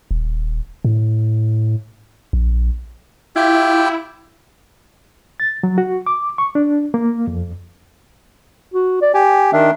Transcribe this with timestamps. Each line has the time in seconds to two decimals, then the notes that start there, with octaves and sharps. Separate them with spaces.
0.11 D#1
0.85 A2
2.33 A#1
3.36 E4 F4 G4 G5
5.40 A6
5.63 F#3
5.78 F#4
6.07 D6
6.38 C#6
6.55 D4
6.94 A#3
7.27 F2
8.74 F#4
9.02 D5
9.14 G4 G#5
9.53 D#3 D4 E5